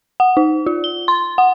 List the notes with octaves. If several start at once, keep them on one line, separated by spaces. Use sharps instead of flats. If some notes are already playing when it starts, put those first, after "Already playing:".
F#5
D#4
F4
G7
C6
F#5